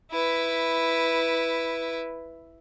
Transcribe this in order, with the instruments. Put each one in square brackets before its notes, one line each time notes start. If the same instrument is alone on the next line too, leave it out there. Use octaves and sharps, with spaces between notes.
[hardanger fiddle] E4 B4